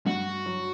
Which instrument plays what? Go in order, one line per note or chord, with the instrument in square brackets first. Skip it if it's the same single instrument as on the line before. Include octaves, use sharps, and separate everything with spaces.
[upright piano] G2 [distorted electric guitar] F#4
[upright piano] F#3